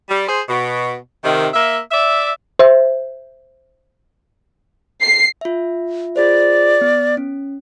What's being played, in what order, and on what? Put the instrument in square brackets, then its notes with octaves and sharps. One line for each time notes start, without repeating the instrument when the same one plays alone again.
[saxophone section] G3
G#4 C5
B2
C3 D#3
A#3 E5
D5 E5
[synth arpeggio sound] C5 E5
[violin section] C7
[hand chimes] F4 E5
[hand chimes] F4 G#4 C5 [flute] D5
[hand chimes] B3
C#4